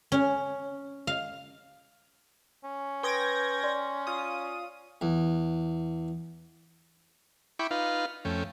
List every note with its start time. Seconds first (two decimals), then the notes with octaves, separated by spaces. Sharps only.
0.12 C#4
1.07 F5
2.64 C#4
3.03 B4 G5 C6 D#6 G#6 A#6
3.64 D5 C6
4.07 F4 D#6
5.01 E2
7.59 E4 G5 B5 C#6 D6
7.71 D#4 F4 B4 F5
8.25 F2 A3 C#4 G5